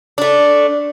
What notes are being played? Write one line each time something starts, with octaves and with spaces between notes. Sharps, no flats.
A3 D4